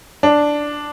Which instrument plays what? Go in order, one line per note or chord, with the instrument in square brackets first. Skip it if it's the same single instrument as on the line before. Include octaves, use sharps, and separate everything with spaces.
[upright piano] D4